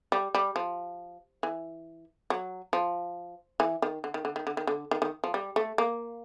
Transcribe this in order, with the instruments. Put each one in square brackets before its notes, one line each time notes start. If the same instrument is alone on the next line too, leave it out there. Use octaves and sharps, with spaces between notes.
[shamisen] G3
G3
F3
E3
F#3
F3
E3
D#3
D3
D#3
D3
D#3
D3
D#3
D3
D#3
D#3
F3
G3
A3
A#3